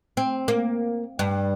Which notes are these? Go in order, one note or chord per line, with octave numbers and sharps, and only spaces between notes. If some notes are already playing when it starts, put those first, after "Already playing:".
C4
A#3
G2